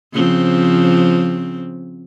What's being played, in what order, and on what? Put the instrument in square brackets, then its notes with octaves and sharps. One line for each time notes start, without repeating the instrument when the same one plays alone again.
[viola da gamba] C#3 F3 C4